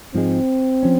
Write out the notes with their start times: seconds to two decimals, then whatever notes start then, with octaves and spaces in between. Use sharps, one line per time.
0.14 G#2 F3 G#3 C4
0.83 F3 C#4